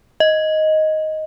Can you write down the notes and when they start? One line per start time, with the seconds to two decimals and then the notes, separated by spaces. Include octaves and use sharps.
0.20 D#5